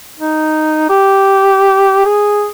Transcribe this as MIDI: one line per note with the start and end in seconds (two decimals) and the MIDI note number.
0.19 0.86 63
0.89 2.01 67
2.05 2.48 68